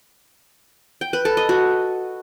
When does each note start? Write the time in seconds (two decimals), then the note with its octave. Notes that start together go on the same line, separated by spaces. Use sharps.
1.01 G5
1.13 B4
1.25 A4
1.37 D#5
1.49 F#4